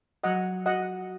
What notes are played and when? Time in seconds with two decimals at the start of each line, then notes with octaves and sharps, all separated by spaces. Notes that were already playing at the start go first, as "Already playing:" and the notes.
0.24 F#3 D#5 F#5
0.66 F#4 D#5 F#5